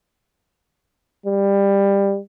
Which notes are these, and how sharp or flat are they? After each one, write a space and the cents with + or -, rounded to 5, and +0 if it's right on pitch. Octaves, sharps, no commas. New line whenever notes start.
G3 +20